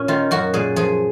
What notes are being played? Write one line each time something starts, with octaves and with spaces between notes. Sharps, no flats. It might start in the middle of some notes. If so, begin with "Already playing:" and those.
Already playing: A#2 C#4
D#3 F4
F#2 F#4
A#2 G#4
F3 G#4